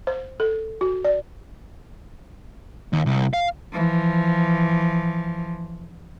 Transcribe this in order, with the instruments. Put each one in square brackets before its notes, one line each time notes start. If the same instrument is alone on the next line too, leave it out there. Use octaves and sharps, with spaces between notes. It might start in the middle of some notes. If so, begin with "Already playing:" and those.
[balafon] C5
A4
F#4
D5
[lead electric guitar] D#2
C2
F5
[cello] E3 F3